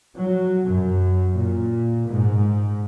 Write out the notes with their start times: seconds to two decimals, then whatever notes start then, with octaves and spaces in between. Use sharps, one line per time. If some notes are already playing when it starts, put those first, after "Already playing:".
0.16 F#3
0.64 F#2
1.35 A#2
2.07 G#2